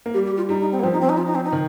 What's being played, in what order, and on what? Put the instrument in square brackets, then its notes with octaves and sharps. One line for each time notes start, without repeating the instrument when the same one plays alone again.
[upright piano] A#3
[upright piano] G3 [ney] G4
[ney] G4
F4
[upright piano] G3 [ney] D#4
[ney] D#4
C4
A#3
[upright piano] F3 [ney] C4
[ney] D#4
C4
D#4
F4
D#4
C4
D#4
[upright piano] D#3